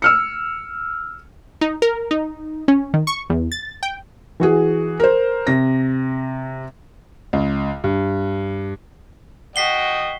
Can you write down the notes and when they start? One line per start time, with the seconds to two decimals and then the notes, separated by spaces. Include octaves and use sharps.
0.02 E6 F6 C#7
1.61 D#4
1.82 A#4
2.11 D#4
2.68 C#4
2.94 D#3
3.07 C#6
3.30 E2
3.52 A6
3.83 G5
4.40 E3 F#4 G#4
5.00 A#4 C5
5.47 C3 A#6
7.33 C#2
7.84 G2
9.56 F#4 D#5 G5 B6 C7 G7